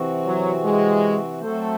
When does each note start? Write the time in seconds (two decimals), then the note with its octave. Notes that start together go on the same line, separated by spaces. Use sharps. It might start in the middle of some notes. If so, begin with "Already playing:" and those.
Already playing: C3 E3 C4 F#4
0.26 F#3
0.64 G#3
1.41 F#3 A3 C4 F#4 A4 C5